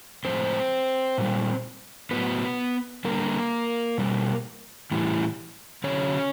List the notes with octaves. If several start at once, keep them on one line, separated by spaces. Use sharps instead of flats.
A2 F3 G#3 C4 C5
A#2 G3
A2 F#3 B3 B4
D3 G3 A#3 A#4
B2 G3
A2 E3 G3
D3 F#3 C#4 C#5